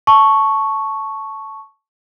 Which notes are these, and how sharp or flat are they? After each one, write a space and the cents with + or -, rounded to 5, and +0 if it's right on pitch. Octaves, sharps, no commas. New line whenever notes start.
A5 +0 C#6 +0